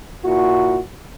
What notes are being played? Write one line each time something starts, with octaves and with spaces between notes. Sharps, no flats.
A#2 E4 F#4